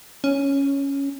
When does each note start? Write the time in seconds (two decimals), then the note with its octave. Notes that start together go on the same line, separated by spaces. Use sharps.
0.24 C#4